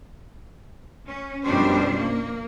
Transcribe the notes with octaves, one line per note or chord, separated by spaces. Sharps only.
C#4
F#2 B2 F3 G3 D4 C5
A#3